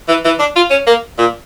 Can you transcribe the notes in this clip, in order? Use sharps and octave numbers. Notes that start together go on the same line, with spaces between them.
E3
E3
D4
F4
C#4
A#3
A#2